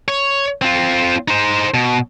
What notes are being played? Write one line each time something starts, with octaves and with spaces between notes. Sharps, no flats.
C#5
C4 F4
D#4 C5
B2